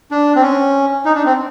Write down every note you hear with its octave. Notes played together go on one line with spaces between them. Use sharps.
D4
C4
C#4
D#4
D4
C4